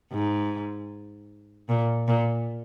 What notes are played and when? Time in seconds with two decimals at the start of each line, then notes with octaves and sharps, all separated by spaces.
0.12 G#2
1.69 A#2
2.08 A#2